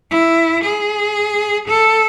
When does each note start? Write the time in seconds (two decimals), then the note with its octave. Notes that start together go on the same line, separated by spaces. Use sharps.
0.11 E4
0.64 G#4
1.68 A4